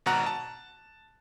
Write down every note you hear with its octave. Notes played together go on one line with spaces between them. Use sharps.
G#1 B2 F#5 A#5 F#6
A5